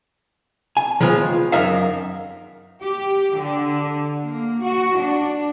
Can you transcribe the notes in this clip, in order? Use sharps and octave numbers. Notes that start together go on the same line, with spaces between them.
G#5
D#3 G#3 B3 F4 C5
F#2 D#4 A#4 E5 F5
G4
D3
A#3
F#4
D4